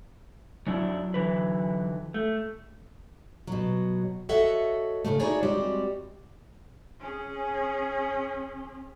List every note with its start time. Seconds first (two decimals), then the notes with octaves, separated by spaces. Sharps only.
0.67 F#2 F#3 D4 E4
1.14 D3 E3 B4
2.14 A3
3.47 B2 F#3
4.29 F#4 A4 C#5 D#5 E5 F#5
5.05 A2 C#3 F3 G#3 A3
5.20 D#4 E4 F#4 G#4 C#5 D5
5.43 G3 G#3 C4 F#4 G4 D5
7.00 C#4 G#4